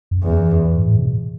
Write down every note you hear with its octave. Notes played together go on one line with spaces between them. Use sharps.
F#2
E2
F#2
G#2
A2
B2